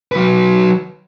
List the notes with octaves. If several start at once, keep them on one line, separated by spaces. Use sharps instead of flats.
F#3 B4